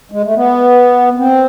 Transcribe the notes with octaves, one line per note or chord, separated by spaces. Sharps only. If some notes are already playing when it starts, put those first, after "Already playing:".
G#3
A3
B3
C4